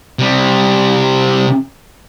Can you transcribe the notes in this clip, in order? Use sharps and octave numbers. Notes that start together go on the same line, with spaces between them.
C3 G3